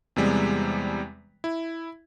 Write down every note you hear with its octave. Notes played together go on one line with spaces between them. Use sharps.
E2 C3 G3 G#3
E4